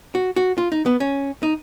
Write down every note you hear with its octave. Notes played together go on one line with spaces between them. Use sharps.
F#4
F#4
F4
D#4
B3
C#4
D#4